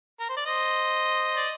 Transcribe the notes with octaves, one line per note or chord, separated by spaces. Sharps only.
A#4
C5
D5
C5 D#5
D5